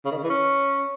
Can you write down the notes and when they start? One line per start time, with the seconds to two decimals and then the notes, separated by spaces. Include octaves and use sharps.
0.05 C#3
0.11 D#3
0.17 C#3
0.24 E3
0.30 C#4